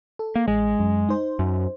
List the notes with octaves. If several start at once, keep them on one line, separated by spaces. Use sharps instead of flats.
A4
A#3
A1 G#3
F#2
D#4 C5
F#2